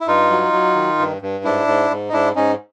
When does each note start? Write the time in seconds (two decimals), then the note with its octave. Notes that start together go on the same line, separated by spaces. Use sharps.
0.01 E4
0.07 G2 D#4 F4
0.30 F#3
0.53 F#3
0.76 D#3
0.99 G2
1.22 G2
1.44 G#2 D4 E4
1.68 G#2
1.90 G#2
2.09 D#4
2.13 G#2 D4 E4
2.36 G#2 C#4 D#4